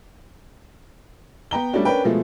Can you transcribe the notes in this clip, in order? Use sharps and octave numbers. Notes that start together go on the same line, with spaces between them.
B3 G5 A#5 G7
G3 A3 C#4 D4 F#4
C#4 D4 A#4 B4 G5
B2 F3 G#3 A3